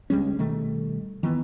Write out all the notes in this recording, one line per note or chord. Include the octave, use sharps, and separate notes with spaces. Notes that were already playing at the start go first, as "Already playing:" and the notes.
C#2 G3 G#3 C#4
B2 D#3 G3 A3
D#3 E3 B3